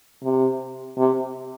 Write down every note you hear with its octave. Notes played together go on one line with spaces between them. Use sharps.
C3
C3